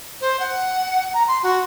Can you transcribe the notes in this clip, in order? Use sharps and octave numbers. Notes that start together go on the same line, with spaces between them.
C5
F#5
A#5
C6
F#4